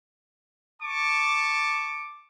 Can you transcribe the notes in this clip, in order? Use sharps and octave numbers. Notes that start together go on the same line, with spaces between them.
A5 C#6 D6